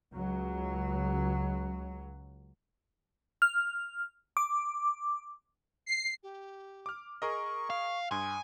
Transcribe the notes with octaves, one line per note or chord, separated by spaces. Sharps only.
C#2 F#3
F6
D6
C7
G4
D6 F6
G#4 A#4 D#5 C#6
F5
G2 G#5 C6 D#6